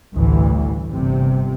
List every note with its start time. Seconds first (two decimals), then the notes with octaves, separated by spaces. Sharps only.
0.15 A1 D2 G2 E3
0.90 G1 C3